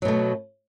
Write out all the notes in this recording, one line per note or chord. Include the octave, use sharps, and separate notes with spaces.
B2 F#3 A3